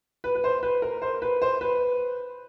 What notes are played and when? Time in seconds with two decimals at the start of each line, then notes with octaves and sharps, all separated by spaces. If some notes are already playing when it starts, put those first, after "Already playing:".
0.24 B4
0.35 B4
0.44 C5
0.63 B4
0.82 A#4
1.02 C5
1.22 B4
1.42 C5
1.61 B4